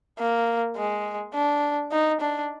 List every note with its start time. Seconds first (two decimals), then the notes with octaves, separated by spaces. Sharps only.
0.19 A#3
0.76 G#3
1.34 D4
1.92 D#4
2.21 D4